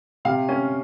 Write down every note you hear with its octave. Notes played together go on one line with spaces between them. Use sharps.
C3 F5
C#4